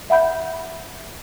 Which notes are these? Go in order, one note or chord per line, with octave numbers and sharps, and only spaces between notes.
E5 F#5 B5 G6